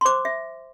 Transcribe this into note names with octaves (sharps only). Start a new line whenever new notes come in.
C6
C5 D6
E5